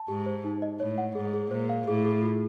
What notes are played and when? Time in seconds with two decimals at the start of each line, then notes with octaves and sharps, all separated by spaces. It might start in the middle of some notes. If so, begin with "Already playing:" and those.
Already playing: A5
0.08 G#2 G4
0.26 C5
0.44 D#4
0.62 D#5
0.80 A2 C#5
0.98 F#5
1.15 G#2 G#4
1.34 G#4
1.51 A#2 C5
1.69 F5
1.88 A2 G#4
2.05 G#4
2.23 F4